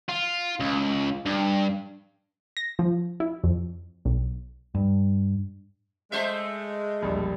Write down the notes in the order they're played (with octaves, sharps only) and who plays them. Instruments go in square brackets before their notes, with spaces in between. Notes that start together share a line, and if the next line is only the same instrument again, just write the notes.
[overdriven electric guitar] F4
C#2
G2
[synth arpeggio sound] A#6
F3
E4
F2
B1
[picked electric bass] G2
[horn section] G#3 [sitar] A3 C5 E5
[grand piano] E1 A#1 G3